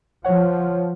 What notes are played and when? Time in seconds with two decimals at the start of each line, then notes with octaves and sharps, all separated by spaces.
0.24 F3 C#5 F#5